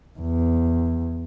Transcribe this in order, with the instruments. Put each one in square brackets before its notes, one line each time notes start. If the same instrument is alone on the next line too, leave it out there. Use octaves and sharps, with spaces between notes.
[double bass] E2